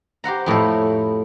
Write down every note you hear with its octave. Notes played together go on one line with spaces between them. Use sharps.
G4 C5 F#5 A#5
F2 A2 E4 C#5